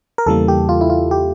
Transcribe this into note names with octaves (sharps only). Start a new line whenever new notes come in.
A#4
E2 C#3 E3 G3 A#3 A4
G4
F4
E4
F4
G4